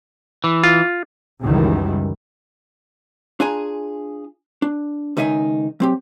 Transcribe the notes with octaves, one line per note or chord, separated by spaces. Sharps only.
E3
F4
C#2 F#2 D#3 E3 G3
D4 F4 G#4 G#5 A#5
D4
C#2 D#3 D#4 E5 G#5
F#3 C4 G4